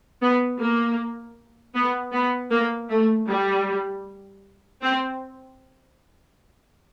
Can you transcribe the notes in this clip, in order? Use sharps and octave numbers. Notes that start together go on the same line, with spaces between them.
B3
A#3
B3
B3
A#3
A3
G3
C4